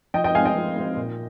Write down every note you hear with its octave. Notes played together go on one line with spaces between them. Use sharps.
F3 D#5 G5
D#5 G5
G#3 C4 F5 G#5
D#5 G5
F3
G#3 C4
A#2